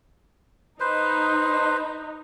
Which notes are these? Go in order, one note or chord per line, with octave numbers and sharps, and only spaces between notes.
D#4 B4 C5